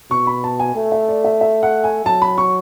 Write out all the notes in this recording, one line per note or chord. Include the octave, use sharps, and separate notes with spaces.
B2 C#6
B5
A5
G#5
A3 G#5
E5
D5
E5
E5
F#5
G#5
F#3 A5
B5
C#6